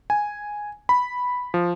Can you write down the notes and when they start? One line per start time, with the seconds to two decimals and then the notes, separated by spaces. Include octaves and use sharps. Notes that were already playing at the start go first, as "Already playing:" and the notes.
0.10 G#5
0.89 B5
1.54 F3